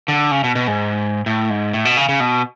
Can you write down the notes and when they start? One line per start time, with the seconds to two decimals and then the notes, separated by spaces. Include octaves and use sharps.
0.08 D3
0.31 C#3
0.44 B2
0.55 B2
0.67 G#2
1.26 A2
1.50 G#2
1.73 A2
1.85 B2
1.97 C#3
2.09 C#3
2.20 B2